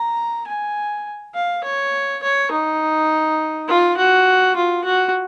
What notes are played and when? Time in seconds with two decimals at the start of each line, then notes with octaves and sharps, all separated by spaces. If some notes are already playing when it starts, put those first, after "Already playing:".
Already playing: A#5
0.47 G#5
1.34 F5
1.64 C#5
2.23 C#5
2.51 D#4
3.68 F4
3.97 F#4
4.56 F4
4.85 F#4